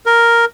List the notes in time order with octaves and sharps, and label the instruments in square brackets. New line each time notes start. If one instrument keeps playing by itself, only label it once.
[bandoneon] A#4